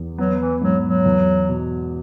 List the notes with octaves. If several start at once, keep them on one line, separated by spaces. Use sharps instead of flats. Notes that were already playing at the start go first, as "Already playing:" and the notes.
Already playing: E2
F#3 B3
E3
G#2 F#3
F#3
E2
B2